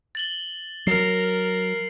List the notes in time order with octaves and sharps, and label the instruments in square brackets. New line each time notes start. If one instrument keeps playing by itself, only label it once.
[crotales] A6 F#7 G7
[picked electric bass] F#3 [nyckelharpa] A#4 [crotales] C7